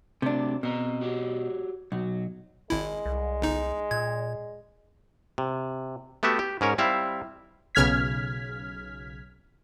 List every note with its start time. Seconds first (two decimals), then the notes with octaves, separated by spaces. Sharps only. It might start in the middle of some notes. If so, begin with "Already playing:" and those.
0.22 C3 F#3 A3 D4
0.63 B2 C4 A#5
1.01 F#4 G4 C#5
1.92 B1 F#3
2.70 G#1 G#3 E4
3.05 C2
3.42 G1 D#4
3.91 A#2 G#6
5.38 C3
6.23 A3 B3 F#4 G4 E5
6.39 G4
6.61 G#2 C#4 A#4 C#5
6.78 G3 C4 E4 E5 F5
7.75 B1 C#3 F6 G#6 B6